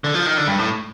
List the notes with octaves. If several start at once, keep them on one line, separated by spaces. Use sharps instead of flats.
D3
F3
D#3
D3
G2
A2